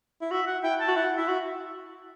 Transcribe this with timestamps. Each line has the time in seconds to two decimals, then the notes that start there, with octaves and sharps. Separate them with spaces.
0.21 E4
0.31 F#4 E5
0.47 F#5
0.63 E4 G5
0.80 A5
0.88 F#4
0.96 E4 F#5
1.17 E4 E5
1.28 F#4